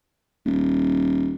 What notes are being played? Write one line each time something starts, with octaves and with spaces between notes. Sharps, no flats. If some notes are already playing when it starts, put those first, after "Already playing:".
D#1